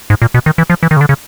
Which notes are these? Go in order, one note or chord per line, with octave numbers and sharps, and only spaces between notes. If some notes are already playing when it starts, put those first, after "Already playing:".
G#2
A#2
B2
D#3
E3
F3
E3
D#3
C#3
D3
C#3